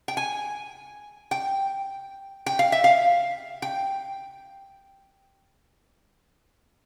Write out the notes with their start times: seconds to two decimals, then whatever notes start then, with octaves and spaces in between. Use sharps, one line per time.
0.08 G5
0.17 G#5
1.31 G5
2.46 G5
2.59 F5
2.72 E5
2.84 F5
3.62 G5